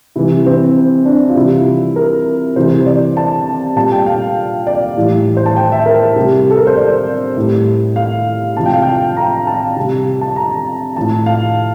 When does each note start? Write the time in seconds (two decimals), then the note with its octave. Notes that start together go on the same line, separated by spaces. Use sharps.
0.16 C3 E3 G3 E4
0.47 C4
1.05 D4
1.29 F4
1.36 C3 E3 G3 E4
1.96 A#4
2.56 C3 E3 G3 C5
2.86 D5
3.17 A5
3.76 A#2 G3 A5
3.92 G5
4.06 F5
4.67 D5
4.97 A2 E3 G3
5.37 C5
5.46 A5
5.57 G5
5.72 E5
5.86 A#4
6.16 C3 G3
6.51 A4
6.57 A#4
6.67 C5
6.77 D5
7.37 A2 G3
7.96 F5
8.57 C3 F3 A5
8.66 G5
8.73 F5
8.82 G5
9.17 A#5
9.47 A5
9.76 C3 G3
10.21 A5
10.36 A#5
10.96 A2 F3 A5
11.26 F5